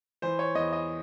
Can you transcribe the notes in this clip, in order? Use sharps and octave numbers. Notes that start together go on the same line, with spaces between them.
E3 C5
C#5
E2 D#5
D#5